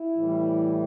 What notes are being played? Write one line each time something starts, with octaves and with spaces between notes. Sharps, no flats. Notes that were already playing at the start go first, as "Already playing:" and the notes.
Already playing: E4
A2 E3 G3